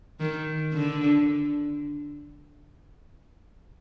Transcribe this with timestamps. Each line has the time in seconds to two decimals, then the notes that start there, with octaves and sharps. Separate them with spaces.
0.20 D#3
0.73 D3